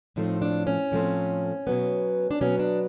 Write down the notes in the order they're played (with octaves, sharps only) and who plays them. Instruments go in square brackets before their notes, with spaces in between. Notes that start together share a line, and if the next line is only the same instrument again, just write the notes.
[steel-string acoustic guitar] A2 F3 A3 C4 D#4
D4
C#4
A2 F3 A3 C4
B2 F#3 B3
D4
B2 F#3 B3 C#4
D4